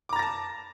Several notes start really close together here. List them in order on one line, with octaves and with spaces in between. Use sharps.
D6 A#5 A6 A#6 A5